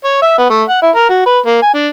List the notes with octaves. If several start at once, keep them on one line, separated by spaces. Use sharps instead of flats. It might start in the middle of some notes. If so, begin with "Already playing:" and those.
C#5
E5
B3
A3
F#5
E4
A#4
F#4
B4
A#3
G#5
D4